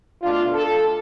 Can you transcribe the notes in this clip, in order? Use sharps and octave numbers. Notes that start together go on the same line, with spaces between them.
B2 A3 D4 F4
A4